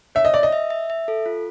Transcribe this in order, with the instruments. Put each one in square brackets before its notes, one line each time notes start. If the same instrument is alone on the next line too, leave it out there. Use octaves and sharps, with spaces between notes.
[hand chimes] C#5 [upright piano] E5
[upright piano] D#5
[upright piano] D5 [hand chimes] E5
[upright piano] D#5
[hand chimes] E5
E5
E5
A4
F4